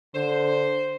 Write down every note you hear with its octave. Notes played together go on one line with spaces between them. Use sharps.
D3 C5